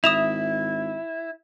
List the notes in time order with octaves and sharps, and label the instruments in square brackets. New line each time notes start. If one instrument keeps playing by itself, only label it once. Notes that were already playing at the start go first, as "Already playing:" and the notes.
[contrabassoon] G#1 [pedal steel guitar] E4 [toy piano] E5 [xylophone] D#6 E7 F7